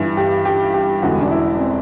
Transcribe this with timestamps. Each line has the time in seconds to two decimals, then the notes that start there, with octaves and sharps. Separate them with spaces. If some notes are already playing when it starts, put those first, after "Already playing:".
Already playing: G1 G2 E3
0.17 G4
0.45 G4
0.74 G4
1.02 E1 E2 D3 F#4
1.21 D4
1.31 E4
1.59 C4